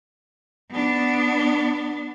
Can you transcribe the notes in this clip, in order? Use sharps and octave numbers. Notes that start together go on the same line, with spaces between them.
B3 D4